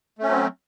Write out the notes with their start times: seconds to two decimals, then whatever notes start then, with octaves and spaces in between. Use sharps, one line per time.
0.19 A3
0.23 C#4
0.27 F#3
0.31 C4